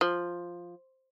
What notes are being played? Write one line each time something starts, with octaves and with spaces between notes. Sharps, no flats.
F3